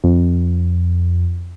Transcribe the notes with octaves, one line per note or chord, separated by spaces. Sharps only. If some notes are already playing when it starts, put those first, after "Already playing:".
F2